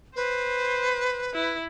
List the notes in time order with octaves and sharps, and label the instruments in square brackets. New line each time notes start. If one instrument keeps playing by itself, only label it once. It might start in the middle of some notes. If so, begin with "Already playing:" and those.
[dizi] B4 [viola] C5
[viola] E4